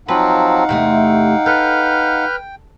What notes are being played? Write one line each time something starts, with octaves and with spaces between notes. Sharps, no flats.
F3 F#3 C4 D#4 B4 F5 F#5
E2 C3 A3 G5
A4 B4 F6 G6